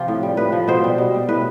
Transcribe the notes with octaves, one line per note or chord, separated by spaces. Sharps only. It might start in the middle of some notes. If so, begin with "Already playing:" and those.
Already playing: C3 F3 F4 G4
A2
G3
A2 B4
F3
B2 C5
G3
B2
G3
A2 B4